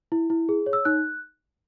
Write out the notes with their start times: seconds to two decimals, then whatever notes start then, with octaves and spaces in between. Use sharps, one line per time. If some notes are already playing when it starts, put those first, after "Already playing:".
0.12 E4
0.30 E4
0.49 G#4
0.66 C#5
0.73 E6
0.85 D#4 F#6